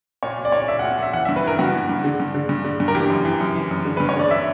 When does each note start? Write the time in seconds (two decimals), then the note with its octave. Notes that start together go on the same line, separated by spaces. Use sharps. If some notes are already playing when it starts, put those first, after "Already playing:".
0.23 A#2 C#5
0.38 A#2
0.45 D5
0.52 A#2 C#5
0.60 D5
0.68 A#2 E5
0.79 F#5
0.83 A#2
0.91 F#5
0.98 A#2 E5
1.13 E3 F#5
1.25 E5
1.29 G2
1.36 B4
1.44 E3 A#4
1.59 G2 F#4
1.74 E3
1.89 G2
2.04 D3
2.20 G2
2.34 D3
2.49 G2
2.64 D3
2.80 G2
2.88 A#4
2.95 E3 G4
3.10 F#2
3.25 E3
3.41 F#2
3.55 E3
3.71 F#2
3.85 D3
3.97 B4
4.00 G2
4.09 C#5
4.16 D3 D5
4.31 E5